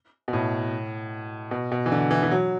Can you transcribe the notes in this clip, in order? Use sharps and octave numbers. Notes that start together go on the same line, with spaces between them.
B2
A2
B2
B2
E3
D3
E3
E3
F#3